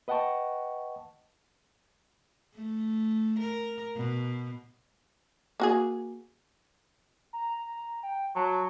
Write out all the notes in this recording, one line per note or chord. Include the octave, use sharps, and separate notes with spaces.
B4 D#5 F#5 G5 A5 C#6
A3
A#4
B2
A#3 F#4 G#4
A#5
G5
F#3 A5